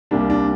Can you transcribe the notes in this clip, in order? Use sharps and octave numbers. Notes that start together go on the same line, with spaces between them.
C2 C3 G3 A#3 D4
D4